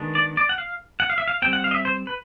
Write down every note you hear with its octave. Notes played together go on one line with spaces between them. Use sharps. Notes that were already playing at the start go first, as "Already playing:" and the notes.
Already playing: D#3 G#3 B3 D4
D5
D5
F#5
F5
F#5
F5
E5
F5
G3 C4 G5
F#5
F5
D#5
E5
C5
B4